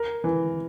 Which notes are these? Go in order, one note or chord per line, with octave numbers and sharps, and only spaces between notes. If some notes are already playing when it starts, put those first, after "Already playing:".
Already playing: A#4
E3